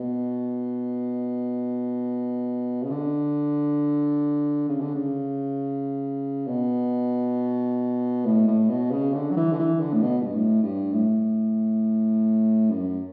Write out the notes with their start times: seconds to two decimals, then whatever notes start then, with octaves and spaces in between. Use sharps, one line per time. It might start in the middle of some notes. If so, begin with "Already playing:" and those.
Already playing: B2
2.83 C#3
2.91 D3
4.69 C#3
4.81 D3
4.94 C#3
6.47 B2
8.26 A2
8.47 A2
8.69 B2
8.91 C#3
9.14 D3
9.31 F#3
9.37 E3
9.53 D3
9.59 E3
9.81 D3
9.93 A2
10.03 B2
10.22 G2
10.33 A2
10.63 G2
10.93 A2
12.70 F#2